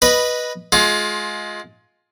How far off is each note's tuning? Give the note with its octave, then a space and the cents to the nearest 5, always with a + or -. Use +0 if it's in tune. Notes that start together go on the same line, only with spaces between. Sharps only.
B4 -10 D#5 +0 B5 +0
G#3 +25 F4 +25